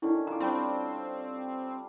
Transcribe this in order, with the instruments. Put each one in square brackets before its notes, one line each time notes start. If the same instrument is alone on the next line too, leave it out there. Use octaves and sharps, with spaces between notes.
[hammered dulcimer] D3 D#3 C#4 [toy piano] E4
[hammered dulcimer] F4 D6 [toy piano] A#5
[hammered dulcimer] G3 D4 [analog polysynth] C4